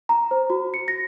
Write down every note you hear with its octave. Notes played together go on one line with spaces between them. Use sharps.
A#5
C5
F#4
C#7
A#6